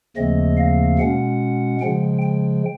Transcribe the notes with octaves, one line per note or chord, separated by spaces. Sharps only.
D#2 C#3 F3 A3 C4 D#5
F5
B2 G#3 C#4 F#5
C#3 F3 G#3 G5
G5